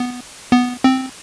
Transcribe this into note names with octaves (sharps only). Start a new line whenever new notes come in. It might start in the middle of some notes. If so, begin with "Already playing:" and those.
Already playing: B3
B3
C4